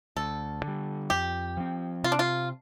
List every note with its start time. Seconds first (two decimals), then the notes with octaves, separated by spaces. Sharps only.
0.17 D2 A4
0.63 D3 G3
1.10 F2 G4
1.57 F3 C4
2.04 C3 F4
2.12 D4
2.19 F4